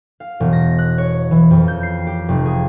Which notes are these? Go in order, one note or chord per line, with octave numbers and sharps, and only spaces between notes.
F5
E1
A#6
F#6
C#5
E3
F2
G6
C7
G4
F1
G#4